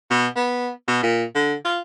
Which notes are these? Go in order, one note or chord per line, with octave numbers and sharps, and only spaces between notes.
B2
B3
B2
A#2
D3
F4